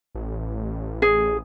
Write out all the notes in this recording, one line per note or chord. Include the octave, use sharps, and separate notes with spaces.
A1
G#4